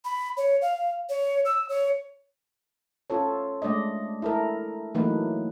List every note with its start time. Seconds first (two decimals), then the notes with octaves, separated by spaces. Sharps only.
0.05 B5
0.37 C#5
0.62 F5
1.09 C#5
1.45 E6
1.69 C#5
3.10 C#4 F4 A4 C#5
3.62 G#3 A3 D4 D5 D#5
4.22 E4 A4 A#4
4.95 E3 F#3 A3 A#3 D#4 B4